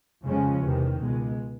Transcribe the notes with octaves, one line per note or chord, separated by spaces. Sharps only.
F2 C#3 F3 G#3 C#4
E2 C3 D#3
C#2 B2 G#3